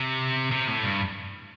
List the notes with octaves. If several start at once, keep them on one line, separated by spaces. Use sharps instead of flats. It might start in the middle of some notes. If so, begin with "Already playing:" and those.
Already playing: C3
C3
A2
G2